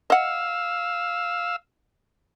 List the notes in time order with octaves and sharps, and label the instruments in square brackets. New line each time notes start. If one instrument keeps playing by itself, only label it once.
[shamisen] D#5 F#5 [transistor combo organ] F5 E6